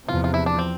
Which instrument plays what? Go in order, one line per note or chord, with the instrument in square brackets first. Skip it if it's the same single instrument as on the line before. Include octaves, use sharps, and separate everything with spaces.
[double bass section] E2 C3 F3 [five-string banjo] F4
[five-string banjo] F4
E4
D4
C4